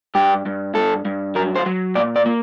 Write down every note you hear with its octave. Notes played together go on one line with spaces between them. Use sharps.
G2 G4
G2
G2 A4
G2
F#3 A#4
C5
F#3
A#2 D5
D5
A#3